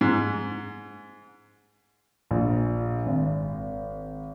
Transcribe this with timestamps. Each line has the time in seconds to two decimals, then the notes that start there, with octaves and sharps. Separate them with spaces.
0.01 G#2
2.31 A#1
3.06 G#1